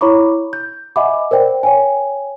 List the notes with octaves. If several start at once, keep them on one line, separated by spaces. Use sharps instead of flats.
E4 C#5 A#5 B5 C#6 D6
G6
D#5 E5 F#5 G#5 B5 D6
A#4 C5 D5 G5
C#5 G5 G#5